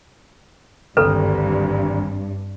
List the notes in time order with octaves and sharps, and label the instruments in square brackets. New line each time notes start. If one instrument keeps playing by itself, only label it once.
[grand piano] G#1 D2 G5 [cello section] G2 [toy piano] A4 B4